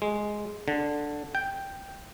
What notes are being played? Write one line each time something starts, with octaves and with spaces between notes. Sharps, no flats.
G#3
D3
G5